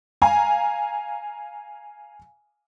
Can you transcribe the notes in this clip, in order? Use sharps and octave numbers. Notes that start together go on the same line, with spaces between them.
F5 G#5 A#5